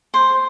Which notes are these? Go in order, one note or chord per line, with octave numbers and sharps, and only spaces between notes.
C5